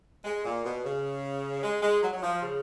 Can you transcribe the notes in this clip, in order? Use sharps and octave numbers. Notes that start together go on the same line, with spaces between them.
G#3
A#2
B2
C#3
G#3
G#3
F#3
F#3
F3
C#3